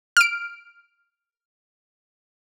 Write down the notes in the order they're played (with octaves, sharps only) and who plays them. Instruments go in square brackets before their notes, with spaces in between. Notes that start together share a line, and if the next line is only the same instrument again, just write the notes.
[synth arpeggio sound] F6 D7